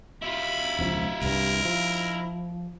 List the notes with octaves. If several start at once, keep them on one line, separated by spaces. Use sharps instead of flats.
E4 F4 B5
E1 C#2 F3
C2 G2 A#4
F3